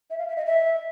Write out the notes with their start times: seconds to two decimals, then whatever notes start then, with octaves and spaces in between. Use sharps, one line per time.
0.10 E5
0.19 F5
0.28 E5
0.37 D#5
0.46 E5